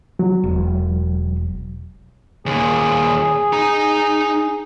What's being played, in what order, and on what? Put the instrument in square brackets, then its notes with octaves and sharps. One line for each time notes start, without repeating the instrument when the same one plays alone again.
[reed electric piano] F#3
[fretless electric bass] E1
[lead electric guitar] D#2 A#2 [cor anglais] G#4
[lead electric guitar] D#4 A#5